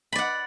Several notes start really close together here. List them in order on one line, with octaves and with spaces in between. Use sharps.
B5 D5 F#5